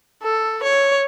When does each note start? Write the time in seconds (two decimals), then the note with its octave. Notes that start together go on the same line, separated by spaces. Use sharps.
0.23 A4
0.63 C#5